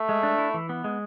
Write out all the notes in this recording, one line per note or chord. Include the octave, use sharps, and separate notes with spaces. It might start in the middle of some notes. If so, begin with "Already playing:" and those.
Already playing: A3
G#3
D4
E4
E3
B3
G#3